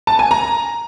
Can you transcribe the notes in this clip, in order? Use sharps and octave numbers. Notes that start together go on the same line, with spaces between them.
A5
G#5
A#5